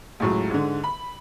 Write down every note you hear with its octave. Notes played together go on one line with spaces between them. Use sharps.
C#2 A2 F#3
G#2 D3
B5